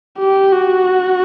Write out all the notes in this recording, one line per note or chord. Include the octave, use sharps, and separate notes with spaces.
G4
F#4